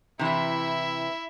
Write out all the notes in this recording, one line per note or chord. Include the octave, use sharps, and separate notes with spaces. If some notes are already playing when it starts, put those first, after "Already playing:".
C3 E3 E4 E5